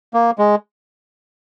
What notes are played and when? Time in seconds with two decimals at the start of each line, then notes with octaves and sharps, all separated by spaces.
0.14 A#3
0.38 G#3